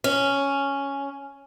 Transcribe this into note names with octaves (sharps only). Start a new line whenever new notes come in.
C#4